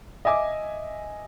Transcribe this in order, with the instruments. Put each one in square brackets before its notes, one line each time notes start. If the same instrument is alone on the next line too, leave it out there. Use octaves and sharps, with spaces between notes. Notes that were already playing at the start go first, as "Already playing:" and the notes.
[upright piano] D#5 E5 G#5 D6